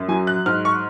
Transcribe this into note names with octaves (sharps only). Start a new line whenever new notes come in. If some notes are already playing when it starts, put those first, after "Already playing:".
Already playing: F#2
F#3 G#5
F#6
G#2 F6
C#6